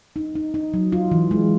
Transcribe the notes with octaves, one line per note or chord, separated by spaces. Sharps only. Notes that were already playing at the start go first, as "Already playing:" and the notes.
D#4
D#4
D#4
F#3
F4
E3
G#3